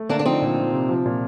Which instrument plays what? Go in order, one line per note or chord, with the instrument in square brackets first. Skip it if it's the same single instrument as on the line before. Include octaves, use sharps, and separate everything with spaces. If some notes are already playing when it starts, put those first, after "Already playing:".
Already playing: [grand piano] A3
[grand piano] D3 [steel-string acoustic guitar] A#3 D4
[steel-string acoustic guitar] D4
[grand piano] F3 [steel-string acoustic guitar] C4 D#4
[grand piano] A#2
F3
C3
F3
A#2